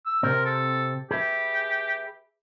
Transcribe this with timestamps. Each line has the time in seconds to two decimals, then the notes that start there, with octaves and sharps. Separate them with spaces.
0.06 E6
0.23 C3 C4 A#4
0.46 A4
1.11 G4 G#4 B4 E5